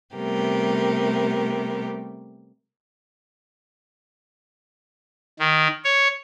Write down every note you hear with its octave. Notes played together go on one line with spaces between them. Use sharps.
C3 G3 A3 B3 G4 A#4
D#3
C#5